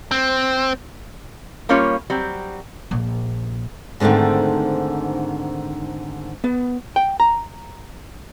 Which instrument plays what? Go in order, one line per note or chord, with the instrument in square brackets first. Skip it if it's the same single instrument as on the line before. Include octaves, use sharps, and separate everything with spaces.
[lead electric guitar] C4
[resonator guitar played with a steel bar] G3 A#3 C#4 F4 C#5
F#3 G3 C4
[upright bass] A#1 A#3
[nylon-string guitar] G#2 D3 D#3 A3 C4
[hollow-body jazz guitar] B3
G5
A#5